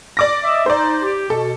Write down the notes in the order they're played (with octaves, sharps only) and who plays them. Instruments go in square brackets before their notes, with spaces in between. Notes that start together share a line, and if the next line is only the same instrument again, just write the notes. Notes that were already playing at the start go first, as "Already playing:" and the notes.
[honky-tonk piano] D5 D6 A#6
[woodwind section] D#5 E5
[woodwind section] D#4 [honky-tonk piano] C5 D5
[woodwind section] G4
[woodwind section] B2 [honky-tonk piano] A4